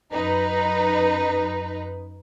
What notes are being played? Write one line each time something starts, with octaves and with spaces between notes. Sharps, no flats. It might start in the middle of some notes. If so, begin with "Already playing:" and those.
F#2 D#4 B4